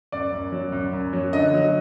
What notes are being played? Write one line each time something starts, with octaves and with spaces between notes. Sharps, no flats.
F#2 D5
F#2
F#3
F#2
F#2
F#3
D3 D#5
F#3